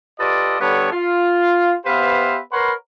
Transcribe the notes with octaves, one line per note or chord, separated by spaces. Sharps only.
F4 G4 A4 B4 D5 D#5
D3 G3 B3 D4 A4 C#5
F4
B3 G4 B4 C5 E5 F5
A#4 B4 C#5 F#5 B5 C6